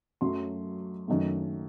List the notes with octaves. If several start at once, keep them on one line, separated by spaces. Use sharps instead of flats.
F#2 F#3 A3 C6
F#1 F#2 D#3 A3